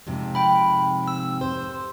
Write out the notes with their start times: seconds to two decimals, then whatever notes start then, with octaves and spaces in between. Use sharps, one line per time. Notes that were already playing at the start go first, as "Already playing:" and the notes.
0.07 F2 G#2 C3
0.35 G5 B5
1.08 E6
1.41 C5